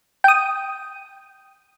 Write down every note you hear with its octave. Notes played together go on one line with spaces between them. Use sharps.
G5 D#6